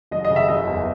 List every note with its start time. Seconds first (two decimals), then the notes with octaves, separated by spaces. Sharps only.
0.11 F#1 D#5
0.24 D#5
0.30 C#3
0.36 E5
0.48 F#1 D#5
0.67 E2